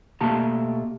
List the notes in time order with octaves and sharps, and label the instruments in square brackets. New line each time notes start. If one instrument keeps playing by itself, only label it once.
[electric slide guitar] B2 A3 A#3 G4 A5 A#5